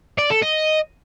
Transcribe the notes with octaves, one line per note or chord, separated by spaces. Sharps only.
D5
A4
D#5